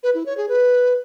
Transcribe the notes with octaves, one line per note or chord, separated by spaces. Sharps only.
B4
E4
C#5
G#4
B4